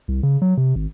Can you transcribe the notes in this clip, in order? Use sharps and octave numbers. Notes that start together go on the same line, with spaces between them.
C2
C#3
F#3
C3
G#1